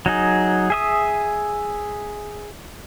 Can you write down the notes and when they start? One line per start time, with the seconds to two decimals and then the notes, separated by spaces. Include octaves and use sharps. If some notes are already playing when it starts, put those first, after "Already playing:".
0.06 F#3 D#4 G#4
0.70 G#4 E5 D#6